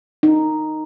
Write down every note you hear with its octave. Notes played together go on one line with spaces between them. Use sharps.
D#4